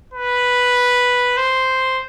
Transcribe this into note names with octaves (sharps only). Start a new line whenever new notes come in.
B4
C5